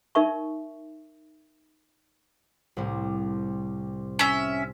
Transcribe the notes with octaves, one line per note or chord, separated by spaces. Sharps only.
D#4 A#4 E5 C#6
C2 A2 C3
C#4 E5